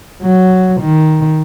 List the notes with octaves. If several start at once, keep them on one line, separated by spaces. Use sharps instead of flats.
F#3
D#3